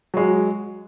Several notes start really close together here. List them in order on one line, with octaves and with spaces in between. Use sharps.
F#3 G#3 F#4